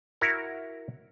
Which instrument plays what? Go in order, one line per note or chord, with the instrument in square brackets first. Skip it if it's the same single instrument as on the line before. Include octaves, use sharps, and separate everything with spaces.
[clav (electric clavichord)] E4 F#4 A#4